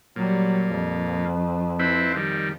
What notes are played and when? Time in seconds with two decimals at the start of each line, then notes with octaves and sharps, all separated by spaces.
0.16 A#2 F#3 G3
0.72 F2
1.79 C4 E4 B4
2.16 D#3 G3